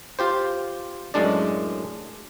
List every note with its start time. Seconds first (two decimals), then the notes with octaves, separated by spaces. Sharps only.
0.19 F4 G4 C5
1.14 F#2 A2 G#3 D4 D5